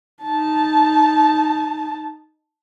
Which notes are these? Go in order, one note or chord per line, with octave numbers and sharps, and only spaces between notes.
D#4 A5